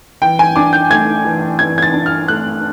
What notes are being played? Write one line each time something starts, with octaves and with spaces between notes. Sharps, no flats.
E3 G5
G#5
D4 D6
G6
A3 G#6
E3
E3 G#6
G#6
A6
D4
F6
A3 F#6